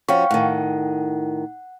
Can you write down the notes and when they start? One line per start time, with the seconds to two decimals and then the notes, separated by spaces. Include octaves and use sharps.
0.09 F3 C#4 F#4 F5 G5 C#6
0.31 A2 D#3 F#5